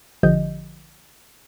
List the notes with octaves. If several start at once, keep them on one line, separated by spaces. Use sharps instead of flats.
A1 D3 F3 G4 D#5 G6